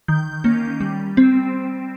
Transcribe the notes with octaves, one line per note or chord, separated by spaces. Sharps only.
D#3 G6
A#3 C#4
G3
C4